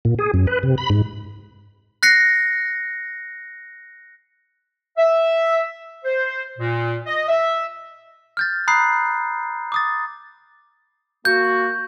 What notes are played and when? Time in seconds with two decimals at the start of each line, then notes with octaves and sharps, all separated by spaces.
0.05 A#2
0.19 G#4
0.34 F#2
0.47 B4
0.63 C3
0.78 B5
0.90 G#2
2.03 F#6 A#6 C7 C#7
4.97 E5
6.04 C5
6.59 A#2
7.06 D#5
7.28 E5
8.37 F6 G6 A6
8.68 A#5 B5 D#6 F#6 C7
9.72 D6 D#6 A6
11.25 A#3 F#4 G6